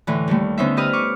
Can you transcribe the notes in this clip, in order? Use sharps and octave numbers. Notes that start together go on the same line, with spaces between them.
A2 D3 E3
D#2 G3 A3
D3 B3 C#4 D#4 C5 E5
G4 B4 D#5 D#6 F6
C#6 D6